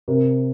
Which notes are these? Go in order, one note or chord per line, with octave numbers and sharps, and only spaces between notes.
C3 A#4